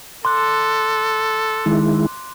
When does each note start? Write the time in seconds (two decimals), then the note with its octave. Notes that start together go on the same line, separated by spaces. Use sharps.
0.25 A4 C6 D6 F#6
1.66 D#3 G#3 E4